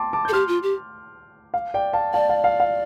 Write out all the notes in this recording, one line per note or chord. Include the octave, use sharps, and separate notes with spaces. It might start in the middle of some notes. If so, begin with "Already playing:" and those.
Already playing: G5 A5 C6 D6
A5 D6
G6
A4
G4 C6 F6
F4
G4
F5
D5 G5
F5 A5
D5 F5 A5
F5
F5
F5